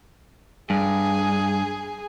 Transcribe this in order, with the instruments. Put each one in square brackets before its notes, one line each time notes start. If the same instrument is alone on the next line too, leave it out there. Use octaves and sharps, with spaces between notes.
[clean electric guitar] G2 [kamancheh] G#4